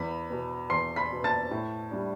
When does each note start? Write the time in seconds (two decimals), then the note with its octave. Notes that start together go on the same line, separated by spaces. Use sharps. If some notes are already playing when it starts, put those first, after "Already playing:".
Already playing: E2 B5 B6
0.30 B2 B3
0.70 E2 C6 C7
0.96 B5 B6
1.11 B2 B3
1.24 A5 A6
1.51 A2
1.91 G3 D4